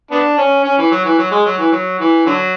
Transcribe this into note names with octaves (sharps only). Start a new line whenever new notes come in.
B3 D4
C#4
C#4
E3
F#3
E3
F#3
G#3
F#3
E3
F#3
E3
D3 F#3